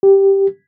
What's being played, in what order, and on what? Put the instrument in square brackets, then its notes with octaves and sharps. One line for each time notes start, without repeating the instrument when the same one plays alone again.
[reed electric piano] G4